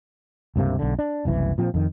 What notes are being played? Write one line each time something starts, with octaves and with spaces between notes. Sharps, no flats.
C#2 G2 C3 A#3
B1 D3
D4
F#1 C2 E3
A#2 F3 C4
F2 D#3